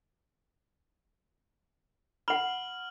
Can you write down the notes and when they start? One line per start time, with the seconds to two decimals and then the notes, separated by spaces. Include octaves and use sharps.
2.28 F#5 B5 F6 F#7